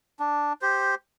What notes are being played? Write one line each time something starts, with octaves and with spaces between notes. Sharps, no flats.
D4
G4 C5